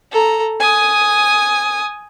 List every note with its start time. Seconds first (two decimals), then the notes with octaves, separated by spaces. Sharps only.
0.11 A4 A#5
0.60 G#5 D#6